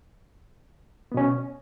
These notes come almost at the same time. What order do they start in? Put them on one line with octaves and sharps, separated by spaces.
B3 B2 C#4